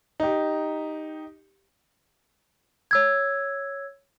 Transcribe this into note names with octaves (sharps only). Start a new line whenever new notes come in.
D#4 G4
C#5 E6 G#6